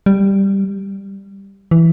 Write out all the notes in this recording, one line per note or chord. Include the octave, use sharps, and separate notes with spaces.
G3
E3